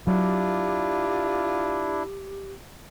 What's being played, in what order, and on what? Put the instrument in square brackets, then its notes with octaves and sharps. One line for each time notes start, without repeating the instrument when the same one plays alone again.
[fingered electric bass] F#3 [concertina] D4 E4 [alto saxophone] F4 [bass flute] G4